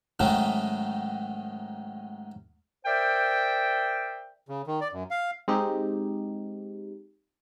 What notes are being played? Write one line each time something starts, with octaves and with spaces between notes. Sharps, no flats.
G#2 D#3 F#3 A3 C#4 D#4
A#4 C5 D5 E5 G5
C#3
D#3
D5
F#2
F5
G#3 C4 D#4 G4